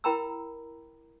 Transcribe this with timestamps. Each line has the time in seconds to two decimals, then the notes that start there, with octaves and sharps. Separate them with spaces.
0.04 E4 A#4 G5 A#5 B5 E6